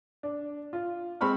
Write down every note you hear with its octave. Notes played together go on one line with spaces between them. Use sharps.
D4
F4
G#3 C4 B5 C#6 F6